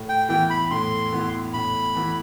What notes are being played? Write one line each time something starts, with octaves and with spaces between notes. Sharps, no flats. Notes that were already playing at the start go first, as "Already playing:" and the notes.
Already playing: A2
G5
E3 B3 E4 G5
B5
A2 C6
E3 B3 E4
A2 B5
E3 B3 E4